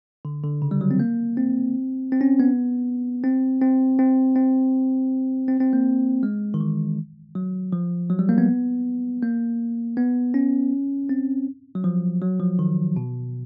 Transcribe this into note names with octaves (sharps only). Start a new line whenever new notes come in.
D3
D3
C#3
G3
F#3
C4
A#3
C4
C4
C#4
B3
C4
C4
C4
C4
C4
C4
A#3
G#3
D#3
E3
F#3
F3
F#3
G3
A#3
B3
A#3
B3
C#4
C4
F#3
F3
F#3
F3
D#3
B2